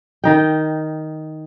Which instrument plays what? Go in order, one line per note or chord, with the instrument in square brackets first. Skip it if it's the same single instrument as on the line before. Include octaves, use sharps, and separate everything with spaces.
[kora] D#3 D#4 G5